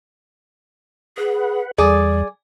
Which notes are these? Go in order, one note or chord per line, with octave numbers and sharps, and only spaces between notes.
G#4 B4 F#5
E2 G3 G#4 D5